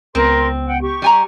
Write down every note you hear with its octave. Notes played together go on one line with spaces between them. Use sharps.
C#2 B3 C4 A#4 C6
F#5 G5
G4 C#6
G3 G#5 A#5